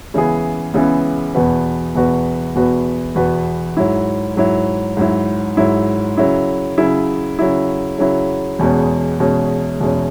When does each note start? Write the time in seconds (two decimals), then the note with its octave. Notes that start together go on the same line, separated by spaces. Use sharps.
0.14 C#2 C#3 E3 B3 G#4
0.74 C#2 C#3 E3 B3 G#4
1.34 E2 B2 B3 F#4 B4
1.95 E2 B2 B3 F#4 B4
2.55 E2 B2 B3 F#4 B4
3.15 E2 B2 B3 F#4 B4
3.77 G#2 F#3 E4
4.36 G#2 F#3 E4
4.97 G#2 F#3 E4
5.57 G#2 F#3 E4
6.17 C#3 F#3 E4
6.78 C#3 F#3 E4
7.39 C#3 F#3 E4
7.98 C#3 F#3 E4
8.59 E2 B2 G#3 C#4
9.19 E2 B2 G#3 C#4
9.80 E2 B2 G#3 C#4